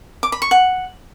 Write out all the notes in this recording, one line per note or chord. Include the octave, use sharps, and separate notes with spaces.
D6
B5
C#6
F#5